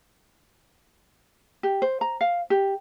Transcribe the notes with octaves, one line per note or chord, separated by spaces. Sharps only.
G4
C5
A#5
F5
G4